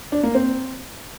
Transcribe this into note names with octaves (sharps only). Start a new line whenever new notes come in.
D4
A#3
C4